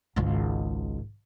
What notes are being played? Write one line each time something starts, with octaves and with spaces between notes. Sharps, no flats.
G#1 C#2